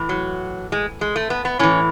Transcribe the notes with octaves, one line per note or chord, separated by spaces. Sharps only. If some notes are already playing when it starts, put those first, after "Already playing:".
Already playing: A2 E3
F#3
G#3
G#3
A3
B3
B3
A2 E3 C#4